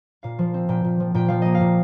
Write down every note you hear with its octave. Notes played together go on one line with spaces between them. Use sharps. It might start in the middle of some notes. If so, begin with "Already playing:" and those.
A#2 F5
F3
C4
A#2 G5
A#2
F3
A#2 G5
F3 F5
A#3 D#5
F5
A#2